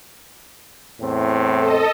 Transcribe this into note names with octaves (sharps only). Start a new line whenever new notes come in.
E2 A2 C4
A4 D#5